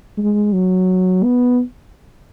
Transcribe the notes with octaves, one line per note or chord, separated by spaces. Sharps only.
G#3
F#3
B3